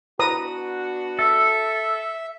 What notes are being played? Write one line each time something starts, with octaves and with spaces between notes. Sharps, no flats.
B3 D4 F#4 B4 A#5 D#6
A4 E5